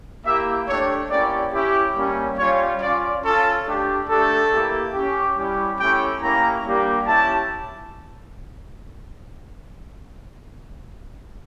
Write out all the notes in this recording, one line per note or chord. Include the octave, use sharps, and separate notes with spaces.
A#3 E4 G4 E5
A3 D4 G4 C#5
A#3 C#4 E4 G4 D5
C#4 E4 G4
G3 A#3 C#4 G4
G3 C#4 F4 C#5
C#4 F4 D5
C#4 F4 A4
A3 D4 G4
A3 D4 G4 A4
A#3 E4 G4
C#4 G4
G3 C#4 E4 G4
A3 C#4 E4 G4 G5
A#3 C#4 E4 G4 A#5
G3 A#3 D4 G4
C#4 E4 G4 A5